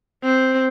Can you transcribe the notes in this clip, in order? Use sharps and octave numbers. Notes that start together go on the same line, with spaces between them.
C4